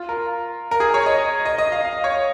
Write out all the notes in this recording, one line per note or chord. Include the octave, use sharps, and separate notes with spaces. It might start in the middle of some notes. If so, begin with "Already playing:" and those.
Already playing: F4
A#4
A#4
G#4
C#5
D#5
D#5
D#5
F5
F5
C#5